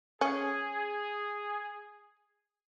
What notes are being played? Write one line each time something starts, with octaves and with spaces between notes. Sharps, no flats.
C#4 G#4